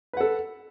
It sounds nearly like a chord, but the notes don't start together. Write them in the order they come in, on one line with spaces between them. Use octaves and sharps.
B4 F#5 A4